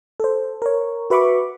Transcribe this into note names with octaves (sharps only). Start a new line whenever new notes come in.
A4 C5
A#4 C#5
F#4 B4 E5 B5 C#6 D6